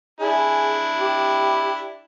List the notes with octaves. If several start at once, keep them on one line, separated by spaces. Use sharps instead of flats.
D4 E4 G#4
G4